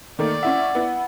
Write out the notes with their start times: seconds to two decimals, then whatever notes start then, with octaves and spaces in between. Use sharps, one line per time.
0.19 D#3 A3 A#3 D5
0.43 C#4 E4 E5 F#5
0.75 B3 E4